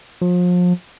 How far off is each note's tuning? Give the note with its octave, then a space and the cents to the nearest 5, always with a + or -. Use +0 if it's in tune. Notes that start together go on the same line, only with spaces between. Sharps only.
F3 +35